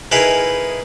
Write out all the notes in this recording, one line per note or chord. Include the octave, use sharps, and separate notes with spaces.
D#4 E4 G#4 A#4 B4